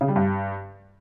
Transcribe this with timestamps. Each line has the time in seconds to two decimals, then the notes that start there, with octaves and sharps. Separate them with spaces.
0.01 C#3
0.08 G3
0.16 G2